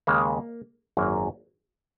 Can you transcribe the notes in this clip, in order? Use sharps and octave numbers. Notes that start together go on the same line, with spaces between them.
D#2 C#3 G#3 A#3
G#1 F#2 F#3 A#3